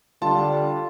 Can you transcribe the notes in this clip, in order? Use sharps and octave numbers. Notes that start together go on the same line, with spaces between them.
D3 G3 F4 A5